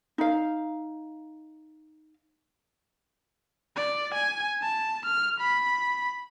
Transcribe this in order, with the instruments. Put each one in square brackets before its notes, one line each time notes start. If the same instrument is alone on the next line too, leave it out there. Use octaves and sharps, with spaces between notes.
[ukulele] D#4 F5
[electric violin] D5
G#5
A5
F6
B5